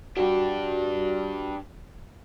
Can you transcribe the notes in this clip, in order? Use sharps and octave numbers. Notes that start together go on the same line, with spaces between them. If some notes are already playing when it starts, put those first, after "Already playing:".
D4 F#4 G4